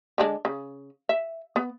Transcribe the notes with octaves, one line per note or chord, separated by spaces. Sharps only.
D3 G#3 D4
C#3
E5
B3